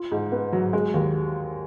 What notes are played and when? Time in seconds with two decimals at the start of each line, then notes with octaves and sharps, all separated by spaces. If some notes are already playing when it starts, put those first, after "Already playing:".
Already playing: F4
0.12 G#2
0.32 B3
0.53 F#3
0.73 G#3
0.94 D#2